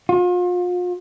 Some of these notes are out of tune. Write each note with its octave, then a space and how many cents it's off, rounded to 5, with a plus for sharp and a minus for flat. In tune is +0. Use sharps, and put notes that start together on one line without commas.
F4 +40